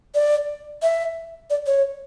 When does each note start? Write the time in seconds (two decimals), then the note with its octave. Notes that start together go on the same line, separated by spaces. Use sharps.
0.15 D5
0.82 E5
1.50 D5
1.66 C#5